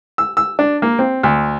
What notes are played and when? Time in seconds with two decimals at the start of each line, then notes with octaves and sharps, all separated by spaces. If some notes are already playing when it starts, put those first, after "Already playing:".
0.18 E6
0.37 E6
0.59 D4
0.82 A#3
0.99 C4
1.23 D2